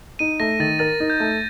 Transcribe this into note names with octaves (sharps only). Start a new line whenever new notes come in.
D#4 D#7
A3 A#6
D#3 A6
A#4 A6
D#4
G6
A3